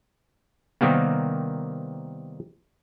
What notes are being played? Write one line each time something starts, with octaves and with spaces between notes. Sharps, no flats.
C3 D#3 G3 A#3 B3